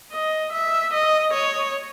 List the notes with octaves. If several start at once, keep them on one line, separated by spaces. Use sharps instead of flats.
D#5
E5
D#5
C#5